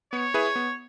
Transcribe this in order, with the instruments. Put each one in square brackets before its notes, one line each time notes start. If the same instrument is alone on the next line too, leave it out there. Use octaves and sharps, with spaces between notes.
[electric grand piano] B3 [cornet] C#5
[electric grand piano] E4 G#4 B4 E5
B3